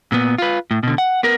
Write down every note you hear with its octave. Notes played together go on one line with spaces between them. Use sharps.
A#2 B3
F4 B4
A2
B2 D3
F#5
B3 A#4